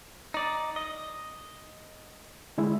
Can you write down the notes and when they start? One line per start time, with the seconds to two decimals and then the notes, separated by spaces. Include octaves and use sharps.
0.34 D#4 D5
0.76 D#5
2.58 D3 G#3 E4